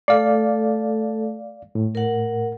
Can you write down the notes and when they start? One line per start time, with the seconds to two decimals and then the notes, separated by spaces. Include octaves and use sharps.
0.08 A3 A4 D5 F5
1.75 A2
1.95 A#4 F#5